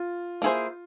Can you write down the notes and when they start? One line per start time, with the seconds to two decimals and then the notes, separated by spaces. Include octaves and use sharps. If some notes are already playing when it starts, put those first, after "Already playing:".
Already playing: F4
0.42 A#3 E4 G#4 C5